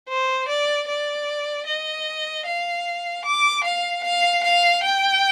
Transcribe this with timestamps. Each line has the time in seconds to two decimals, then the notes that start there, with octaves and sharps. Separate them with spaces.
0.09 C5
0.48 D5
0.88 D5
1.66 D#5
2.46 F5
3.25 D6
3.64 F5
4.04 F5
4.44 F5
4.83 G5